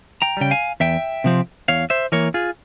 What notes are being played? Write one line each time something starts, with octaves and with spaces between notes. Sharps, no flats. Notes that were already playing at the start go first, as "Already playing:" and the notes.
G5 A#5
C#3 G3 G5
F5 G#5
E2 E5 G5
C3 F3 C4
E2 C#5 F5
C5 E5
E3 A#3 A#4 C#5
F4 G#4